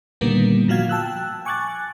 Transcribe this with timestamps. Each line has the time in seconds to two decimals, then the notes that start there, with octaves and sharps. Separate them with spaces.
0.21 A#2 D3 D#3 G3 A#3 B3
0.68 A#2 F3 F#4 F5 G#6
0.89 G5 A5 E6 F#6
1.45 G#5 C#6 D6 F#6 G#6 A6